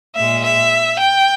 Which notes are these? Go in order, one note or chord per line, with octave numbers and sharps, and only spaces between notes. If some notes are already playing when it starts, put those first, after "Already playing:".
A#2 G#3 E5
E5
G5